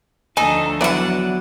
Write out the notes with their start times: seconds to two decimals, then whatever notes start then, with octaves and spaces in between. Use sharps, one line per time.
0.37 D2 F3 D#4 A4 G#5
0.81 E3 F#3 B3 E4 B4 D5 F#5